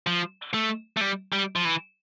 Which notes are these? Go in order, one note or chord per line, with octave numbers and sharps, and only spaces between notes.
F3
A3
A3
G3
G3
F3
E3